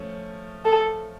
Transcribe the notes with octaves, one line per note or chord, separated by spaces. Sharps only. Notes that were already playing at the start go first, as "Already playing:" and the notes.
Already playing: F3 A3 C#4
A4